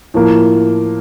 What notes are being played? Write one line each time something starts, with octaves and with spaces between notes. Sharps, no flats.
A2 F3 A#3